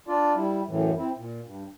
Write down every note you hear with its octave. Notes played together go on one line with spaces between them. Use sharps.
D4 F4 D5
G3 E4
F#2 A2 E3
C4 E4
A#2
G2